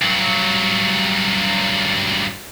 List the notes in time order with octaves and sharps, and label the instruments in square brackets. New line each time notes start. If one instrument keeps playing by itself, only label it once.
[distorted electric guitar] G2 F#3